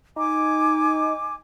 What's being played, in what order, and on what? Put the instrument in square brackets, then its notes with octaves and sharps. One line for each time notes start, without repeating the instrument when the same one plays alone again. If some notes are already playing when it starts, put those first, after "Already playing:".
[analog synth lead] D#4 [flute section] G#5 D6